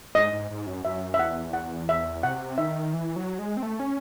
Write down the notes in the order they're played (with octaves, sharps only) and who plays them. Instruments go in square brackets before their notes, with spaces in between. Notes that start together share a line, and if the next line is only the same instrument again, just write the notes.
[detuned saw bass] G#2 [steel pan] D#5
[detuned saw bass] G#2
G#2
F#2
[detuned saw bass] F#2 [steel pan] E5
[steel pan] E5
[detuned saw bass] E2 [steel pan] F#5
[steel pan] F#5
E5
[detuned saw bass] C3 [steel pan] F#5
[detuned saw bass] D#3 [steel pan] E5
[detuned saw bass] E3
F#3
G#3
C4
A3
C#4